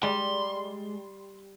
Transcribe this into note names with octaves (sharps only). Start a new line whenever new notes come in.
G3 G#3 C6